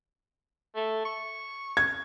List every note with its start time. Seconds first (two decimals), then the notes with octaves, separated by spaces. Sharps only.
0.75 A3
1.05 C#6
1.77 G#6